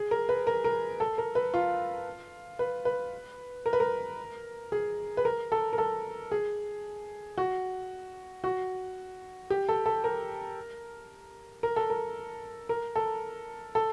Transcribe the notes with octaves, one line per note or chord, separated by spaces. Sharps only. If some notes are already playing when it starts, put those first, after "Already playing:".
Already playing: G#4
A#4
B4
A#4
A#4
A4
A#4
B4
F4
B4
B4
A#4
B4
A#4
G#4
B4
A#4
A4
A#4
A4
G#4
F#4
F#4
G4
A4
A4
A#4
A#4
A4
A#4
A#4
A4
A4